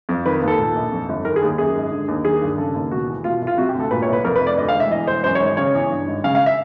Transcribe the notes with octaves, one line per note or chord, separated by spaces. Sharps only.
F2
D#3 B4
D#2
A4
A#2
A#1
F2
G1
D#3 A#4
G#4
D#2
F#2 G#4
G#1
D3
D#2
D#3 G#4
G2
C#3 A4
D#2
B2 F#4
E2
B2 F4
C2
F4
C3 F#4
G4
D2
A4
A#2 B4
C#5
C2 B4
F2 A#4
B4
F1
D5
D2 D#5
F5
E1
E5
E2 D#5
E1 C5
F#2 C5
C#5
G#1
C#5
C#3 C#5
E2
G2
G#1
C#3 F5
F5
E5